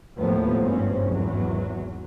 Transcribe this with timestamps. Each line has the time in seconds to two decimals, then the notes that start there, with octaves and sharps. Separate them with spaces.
0.17 D#2 A2 F3 B3
0.60 G#1 G2 C4 C#4
1.06 G#1 E2 F#3